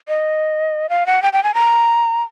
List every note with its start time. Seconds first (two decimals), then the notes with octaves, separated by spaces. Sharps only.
0.08 D#5
0.89 F5
1.06 F#5
1.22 G5
1.33 G5
1.43 G#5
1.54 A#5